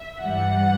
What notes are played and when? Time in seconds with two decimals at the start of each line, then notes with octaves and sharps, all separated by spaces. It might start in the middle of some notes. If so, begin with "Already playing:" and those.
Already playing: E5
0.20 G2 E3 G3 F#5